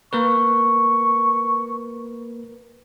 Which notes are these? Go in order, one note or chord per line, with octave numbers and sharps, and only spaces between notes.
A#3 A#4 B4 C#6